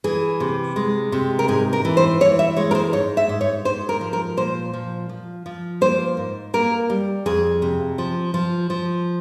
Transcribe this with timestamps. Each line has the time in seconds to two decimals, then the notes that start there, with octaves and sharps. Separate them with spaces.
0.04 E3 G#4
0.40 C3
0.76 G#3
1.12 C3
1.39 A#4
1.48 G#2 G#4
1.73 A#4
1.85 E3
1.97 C5
2.21 E3 C#5
2.39 E5
2.57 G#3 C#5
2.71 A#4
2.75 C5
2.93 G#2 C#5
3.17 E5
3.29 G#2
3.41 C#5
3.65 G#2 C5
3.89 A#4
4.01 F3
4.13 A#4
4.37 A#2 C5
4.73 F3
5.09 F3
5.46 F3
5.81 A#3 C5
6.17 G#2
6.54 A#3 A#4
6.90 G3
7.26 F2 G#4
7.62 C3
7.98 F3
8.34 F3
8.70 F3